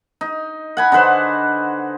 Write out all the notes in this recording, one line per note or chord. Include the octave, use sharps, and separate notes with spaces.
D#4
F#5 G#5 B5
D3 D#4 B4 C5